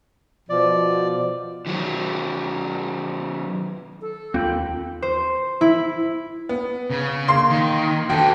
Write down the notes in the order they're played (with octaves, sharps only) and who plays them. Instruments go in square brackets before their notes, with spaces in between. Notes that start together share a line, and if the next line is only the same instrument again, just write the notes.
[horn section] B2 F3 [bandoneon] D5
[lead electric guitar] D#3 F#3
[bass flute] A4
[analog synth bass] D#2 [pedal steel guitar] C4 G5 B5 [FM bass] F4
[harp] C5
E4
[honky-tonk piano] B3
[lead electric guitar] C#3
[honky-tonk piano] A#3 C6 C7
[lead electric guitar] D#3
[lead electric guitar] F#4 A4 [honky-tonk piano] G5